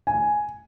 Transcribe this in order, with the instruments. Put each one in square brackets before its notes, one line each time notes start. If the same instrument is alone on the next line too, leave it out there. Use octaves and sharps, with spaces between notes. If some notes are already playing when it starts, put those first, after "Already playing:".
[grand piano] G#5